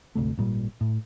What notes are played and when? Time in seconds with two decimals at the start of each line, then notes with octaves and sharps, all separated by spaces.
0.15 G#1 D2 C3 A3
0.37 G#1 A#2 G3
0.81 A2